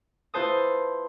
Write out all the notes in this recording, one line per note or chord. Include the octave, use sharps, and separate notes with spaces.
E4 F4 B4 C5 A5 D#6